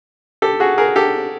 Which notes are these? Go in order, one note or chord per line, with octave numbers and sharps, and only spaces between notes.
G4 A4
F#4 G#4
G#4 A#4
G4 A4